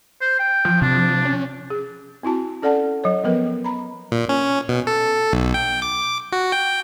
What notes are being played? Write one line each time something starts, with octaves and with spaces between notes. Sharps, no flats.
C5
G5
F3
C3 D4
C#4
G#4
C4 E4 F#4 A5
C#4 A4 D5 F#5 A5
F#3 C#5
F3 F#3 B3 A#4 B4
A#5 B5
A#2
C#4
B2
A4
B1
G5
D6
F#4
G5